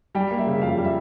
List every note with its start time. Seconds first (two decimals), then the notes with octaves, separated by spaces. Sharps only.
0.15 G3 G5
0.31 A#3
0.38 E5
0.47 C#3
0.62 F2 F5
0.78 G3
0.85 E5